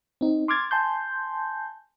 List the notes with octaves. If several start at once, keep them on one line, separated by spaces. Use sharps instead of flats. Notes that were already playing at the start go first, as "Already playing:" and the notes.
C4 D#4
C6 D6 F6 G#6 A6
G#5 A5 C6 G6